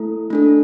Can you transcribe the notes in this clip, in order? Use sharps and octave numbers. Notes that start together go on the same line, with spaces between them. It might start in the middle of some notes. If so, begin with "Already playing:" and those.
Already playing: A3 E4 A4
A3 D4 A4